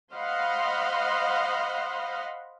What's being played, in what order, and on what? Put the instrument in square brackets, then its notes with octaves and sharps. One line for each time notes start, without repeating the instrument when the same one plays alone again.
[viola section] C5 D#5 F5 F#5 B5 C6